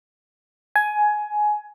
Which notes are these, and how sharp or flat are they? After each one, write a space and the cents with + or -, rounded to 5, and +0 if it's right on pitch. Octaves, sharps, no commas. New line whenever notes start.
G#5 +15